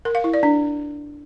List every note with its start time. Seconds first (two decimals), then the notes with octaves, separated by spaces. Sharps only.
0.05 A#4
0.15 F5
0.24 E4
0.34 D5
0.43 D4